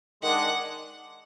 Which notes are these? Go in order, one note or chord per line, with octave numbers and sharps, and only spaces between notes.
D#3 G#3 D4 F#5